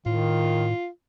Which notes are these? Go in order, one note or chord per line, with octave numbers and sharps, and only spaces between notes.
A2 D#3 F4